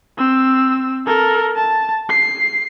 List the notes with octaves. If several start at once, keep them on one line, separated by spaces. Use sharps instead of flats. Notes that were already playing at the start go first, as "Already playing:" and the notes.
C4 E6
A4 A#4
A5
C7